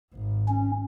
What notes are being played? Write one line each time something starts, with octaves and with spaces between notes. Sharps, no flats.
G#1
C#4